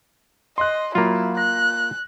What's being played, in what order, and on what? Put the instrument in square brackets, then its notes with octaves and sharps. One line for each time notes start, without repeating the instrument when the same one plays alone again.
[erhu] D#5 [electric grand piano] C6 F#6
[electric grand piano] F#3 [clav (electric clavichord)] A#3 F4 [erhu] E4
[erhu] F#6 [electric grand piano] A#6